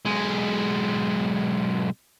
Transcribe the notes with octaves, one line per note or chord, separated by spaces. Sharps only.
B1 G#3